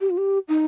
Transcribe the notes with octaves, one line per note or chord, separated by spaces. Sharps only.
G4
F4
G4
D#4